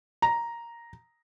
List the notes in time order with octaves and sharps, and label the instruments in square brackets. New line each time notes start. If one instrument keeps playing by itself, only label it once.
[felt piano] A#5